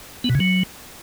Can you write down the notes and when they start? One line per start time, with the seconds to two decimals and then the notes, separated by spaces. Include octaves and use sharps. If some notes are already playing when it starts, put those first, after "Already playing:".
0.24 B3
0.30 B2
0.35 C#3
0.40 F#3